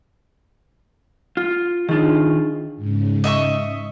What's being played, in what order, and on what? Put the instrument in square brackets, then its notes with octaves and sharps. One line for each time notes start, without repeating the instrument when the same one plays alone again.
[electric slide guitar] F4
[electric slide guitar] D#3 F4 [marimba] D4 D#4 G#4
[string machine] G#2 C#3
[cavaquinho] D#5 E5 C#6